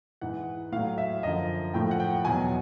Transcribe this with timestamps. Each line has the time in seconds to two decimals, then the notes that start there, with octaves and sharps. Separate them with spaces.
0.21 G#2 E3 F#5
0.72 A2 F5
0.76 F#3
0.98 E5
1.23 F#2 D3 F3 D#5
1.74 A2 F3 G5
1.91 F#5
2.00 G5
2.25 E2 B2 F#3 G#5